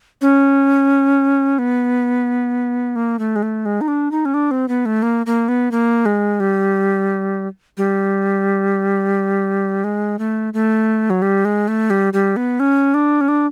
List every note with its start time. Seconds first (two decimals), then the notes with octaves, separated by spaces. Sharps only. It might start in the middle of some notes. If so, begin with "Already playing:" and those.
0.21 C#4
1.59 B3
2.96 A#3
3.19 A3
3.36 G#3
3.43 A3
3.66 G#3
3.81 D#4
3.88 D4
4.11 D#4
4.25 C#4
4.34 D4
4.51 C4
4.68 B3
4.86 A3
5.03 A#3
5.26 A#3
5.48 B3
5.72 A#3
6.06 G#3
6.40 G3
7.77 G3
9.84 G#3
10.19 A3
10.54 A3
11.10 F#3
11.22 G3
11.45 G#3
11.68 A3
11.90 G3
12.13 G3
12.37 B3
12.60 C#4
12.94 D4
13.21 C#4
13.28 D4